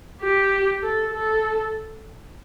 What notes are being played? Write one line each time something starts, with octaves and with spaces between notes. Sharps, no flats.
G4
A4
A4